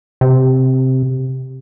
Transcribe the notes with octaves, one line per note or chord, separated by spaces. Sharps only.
C3